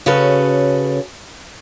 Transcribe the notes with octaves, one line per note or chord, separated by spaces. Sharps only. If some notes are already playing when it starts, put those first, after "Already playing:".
C#3 C#4 F#4 G#4 A4 B4